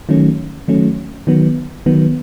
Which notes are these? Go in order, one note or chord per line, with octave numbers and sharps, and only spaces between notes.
D#3 F#3 A3 C#4
D#3 F#3 A3 C#4
D#3 F#3 B3
D#3 F#3 B3